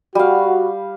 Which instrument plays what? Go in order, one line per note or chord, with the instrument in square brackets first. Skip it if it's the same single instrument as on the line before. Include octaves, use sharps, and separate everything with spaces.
[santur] G3 F5 [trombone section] F#4